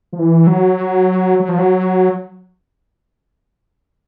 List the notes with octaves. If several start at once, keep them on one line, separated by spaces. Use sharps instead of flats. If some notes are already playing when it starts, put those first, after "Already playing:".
F3
E3
F#3
F#3
F3
F#3